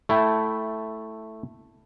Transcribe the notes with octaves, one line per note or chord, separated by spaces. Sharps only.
A3 E4 G5 A5